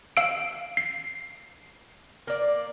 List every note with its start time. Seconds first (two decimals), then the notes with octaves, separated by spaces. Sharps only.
0.17 F5 E6 D7
0.77 C7
2.27 A#3 D5